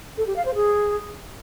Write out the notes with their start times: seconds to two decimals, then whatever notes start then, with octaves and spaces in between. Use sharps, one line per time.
0.18 A4
0.27 G4
0.36 F5
0.45 C5
0.55 G#4